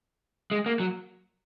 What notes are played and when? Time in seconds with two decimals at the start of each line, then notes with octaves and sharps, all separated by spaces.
0.51 G#3
0.66 A#3
0.80 F#3